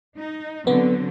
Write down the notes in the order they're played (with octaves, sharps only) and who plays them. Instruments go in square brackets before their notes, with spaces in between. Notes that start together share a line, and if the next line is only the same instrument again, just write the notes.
[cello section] D#4
[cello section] D3 F#3 C4 [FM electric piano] B3